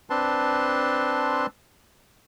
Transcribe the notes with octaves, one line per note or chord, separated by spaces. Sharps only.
C4 D4 B4 A5 C6